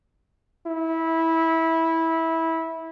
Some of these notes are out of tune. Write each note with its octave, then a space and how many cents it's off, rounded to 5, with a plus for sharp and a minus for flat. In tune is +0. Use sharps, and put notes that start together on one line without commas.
E4 -15